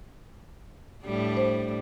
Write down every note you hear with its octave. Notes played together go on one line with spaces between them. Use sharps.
A2 G3 D4
C5